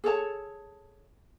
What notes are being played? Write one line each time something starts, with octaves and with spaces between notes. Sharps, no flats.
G#4 A4 C#5 A5